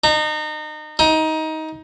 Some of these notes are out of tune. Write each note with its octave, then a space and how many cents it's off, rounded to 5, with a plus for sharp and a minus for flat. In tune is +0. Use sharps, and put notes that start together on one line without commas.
D#4 -30
D#4 +20